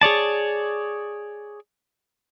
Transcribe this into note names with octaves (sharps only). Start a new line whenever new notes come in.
G#4 C#5 D5 A5